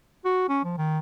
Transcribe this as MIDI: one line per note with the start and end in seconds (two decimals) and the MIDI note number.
0.25 0.44 66
0.49 0.59 61
0.64 0.78 53
0.78 0.99 51